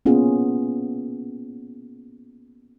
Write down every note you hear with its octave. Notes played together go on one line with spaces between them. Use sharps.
A#3 B3 C#4 F4 G#4